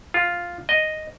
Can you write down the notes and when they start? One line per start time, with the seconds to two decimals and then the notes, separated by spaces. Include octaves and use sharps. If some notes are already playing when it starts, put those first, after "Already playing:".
0.14 F4
0.69 D#5